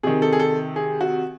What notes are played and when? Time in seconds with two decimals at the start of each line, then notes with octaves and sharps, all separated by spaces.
0.03 C3 D#3 G#4
0.22 A4
0.33 G#4
0.39 A4
0.76 G#4
1.01 F#4